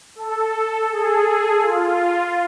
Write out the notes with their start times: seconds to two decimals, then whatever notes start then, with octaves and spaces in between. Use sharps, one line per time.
0.16 A4
0.90 G#4
1.62 F4